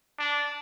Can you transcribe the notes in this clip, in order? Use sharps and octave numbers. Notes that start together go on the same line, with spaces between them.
D4